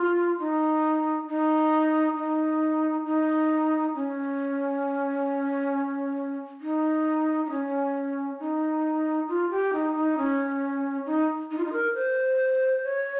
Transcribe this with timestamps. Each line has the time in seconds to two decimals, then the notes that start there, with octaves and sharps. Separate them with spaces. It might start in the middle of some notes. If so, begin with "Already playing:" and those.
Already playing: F4
0.39 D#4
1.28 D#4
2.17 D#4
3.06 D#4
3.95 C#4
6.61 D#4
7.46 D#4
7.51 C#4
8.40 D#4
9.29 F4
9.51 G4
9.73 D#4
9.95 D#4
10.18 C#4
11.06 D#4
11.51 D#4
11.58 F4
11.65 D#4
11.73 A#4
11.95 C5
12.84 C#5